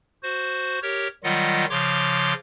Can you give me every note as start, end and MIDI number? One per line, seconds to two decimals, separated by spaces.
0.23 0.79 66
0.23 0.79 72
0.82 1.08 67
0.82 1.08 70
0.82 1.08 73
1.24 1.65 51
1.24 1.65 54
1.24 1.65 55
1.24 1.65 65
1.24 1.65 75
1.24 1.65 78
1.70 2.33 49
1.70 2.33 53
1.70 2.33 73
1.70 2.33 84
1.70 2.33 86